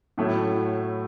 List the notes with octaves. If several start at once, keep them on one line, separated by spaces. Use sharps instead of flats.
A2 F#3 A3 E4